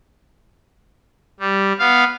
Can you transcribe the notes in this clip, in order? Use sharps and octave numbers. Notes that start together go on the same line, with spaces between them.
G3
B3 F5